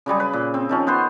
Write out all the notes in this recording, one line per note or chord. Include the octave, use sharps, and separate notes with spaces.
C#3 F#3 G3 G#4
B4
A#2
C4
D#3 F3 C#4
B3 C5 F#5 C6